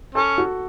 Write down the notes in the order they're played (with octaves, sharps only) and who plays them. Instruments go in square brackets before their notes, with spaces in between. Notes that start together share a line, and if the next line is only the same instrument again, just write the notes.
[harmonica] C#4 [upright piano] A4
[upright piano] F#4